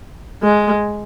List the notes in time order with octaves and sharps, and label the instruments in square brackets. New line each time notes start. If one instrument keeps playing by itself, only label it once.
[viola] G#3